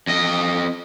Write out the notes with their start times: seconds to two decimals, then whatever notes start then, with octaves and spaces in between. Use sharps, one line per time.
0.07 F2 D#5